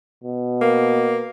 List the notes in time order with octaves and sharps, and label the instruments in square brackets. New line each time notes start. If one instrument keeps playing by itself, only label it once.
[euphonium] B2
[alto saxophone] A#3